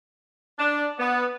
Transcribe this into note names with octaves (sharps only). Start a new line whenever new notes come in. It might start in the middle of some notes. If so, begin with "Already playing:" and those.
D4
B3